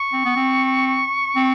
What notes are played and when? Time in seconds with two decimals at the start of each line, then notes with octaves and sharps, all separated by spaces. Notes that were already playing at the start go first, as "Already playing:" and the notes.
Already playing: C#6
0.13 C4
0.25 B3
0.36 C4
1.36 C4